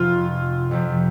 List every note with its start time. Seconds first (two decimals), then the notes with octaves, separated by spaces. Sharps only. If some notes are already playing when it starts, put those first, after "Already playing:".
Already playing: F1 F2 C3 F4
0.71 F2 C3 F3